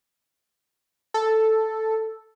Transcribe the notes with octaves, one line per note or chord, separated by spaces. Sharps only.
A4